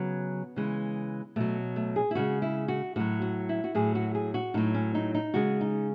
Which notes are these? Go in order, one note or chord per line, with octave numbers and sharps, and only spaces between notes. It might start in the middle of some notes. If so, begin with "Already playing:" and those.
Already playing: C#3 F#3 B3
C#3 E3 G#3
B2 F#3 A3
A3
G#4
E4
C#3 G#3 F#4
E4
F#4
A2 F#3 F#4
F#4
E4
F#4
A2 F#3 G#4
F#4
G#4
F#4
A2 F#3 D#4
C#4
D#4
D#4
C#3 G#3 F#4
D#4